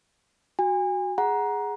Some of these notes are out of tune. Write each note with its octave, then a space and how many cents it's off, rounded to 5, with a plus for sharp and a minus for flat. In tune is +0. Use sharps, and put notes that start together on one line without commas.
F#4 +0 G#5 -35
G#4 +0 F#5 +5 A#5 +20